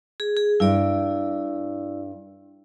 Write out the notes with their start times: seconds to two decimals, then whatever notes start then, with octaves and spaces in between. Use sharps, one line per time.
0.20 G#4
0.37 G#4
0.60 G2 E4 D5